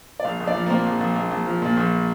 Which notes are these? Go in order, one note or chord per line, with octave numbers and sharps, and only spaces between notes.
D5
A#1 F5
A#1
D5
F3
A#3
A#2 C4
A#1
A#1
A#1
A#1
F3
A#2
A#1